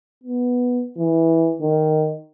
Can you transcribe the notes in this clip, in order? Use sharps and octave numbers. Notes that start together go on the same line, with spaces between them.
B3
E3
D#3